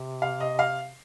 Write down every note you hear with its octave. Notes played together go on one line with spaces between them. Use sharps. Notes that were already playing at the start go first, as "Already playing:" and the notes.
Already playing: C3
F5
D#5
F5